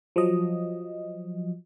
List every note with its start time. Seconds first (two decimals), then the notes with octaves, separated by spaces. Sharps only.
0.16 F3 F#3 D#5